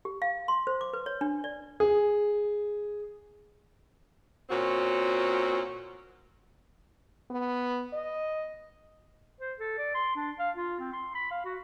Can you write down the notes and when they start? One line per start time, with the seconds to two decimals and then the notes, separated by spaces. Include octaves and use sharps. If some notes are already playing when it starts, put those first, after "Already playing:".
0.05 G4
0.22 F5
0.48 C6
0.67 C5
0.81 D6
0.93 B4
1.06 C#5
1.21 D4
1.44 D5
1.80 G#4
4.50 A#2 C4 C#4 F#4
7.31 B3
7.93 D#5
9.41 C5
9.59 A4
9.78 D5
9.95 C6
10.16 D4
10.39 F5
10.56 F4
10.80 C4
10.93 C6
11.15 B5
11.31 F5
11.45 F#4